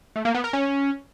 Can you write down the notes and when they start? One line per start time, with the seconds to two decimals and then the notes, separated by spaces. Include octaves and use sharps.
0.16 A3
0.25 A#3
0.34 B3
0.44 A#4
0.53 C#4